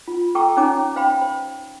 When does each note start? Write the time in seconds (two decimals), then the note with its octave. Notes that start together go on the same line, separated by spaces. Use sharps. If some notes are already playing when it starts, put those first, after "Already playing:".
0.08 F4
0.35 A4 G5 A#5 C#6 D6 E6
0.57 C#4 D#4 C#5 G#5 A#5 D6
0.96 C5 F5 G5 B5
1.22 C5